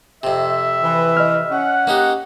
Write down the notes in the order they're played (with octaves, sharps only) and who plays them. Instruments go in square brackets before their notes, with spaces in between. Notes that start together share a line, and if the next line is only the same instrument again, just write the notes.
[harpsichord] F2 C3 [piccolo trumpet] E5
[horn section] E3 B4
[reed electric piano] D#5 F6
[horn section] C#4 F#5
[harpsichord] A#3 D#4 G4